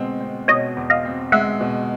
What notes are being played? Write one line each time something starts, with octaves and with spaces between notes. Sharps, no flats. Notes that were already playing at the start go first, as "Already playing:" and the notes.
Already playing: B2 G#3 C4
C4
B2 C#5 D#5
E2
D#5 F5
C4
G#3 E5 F#5
B2